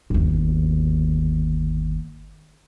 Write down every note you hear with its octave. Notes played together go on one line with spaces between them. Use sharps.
G1 D#2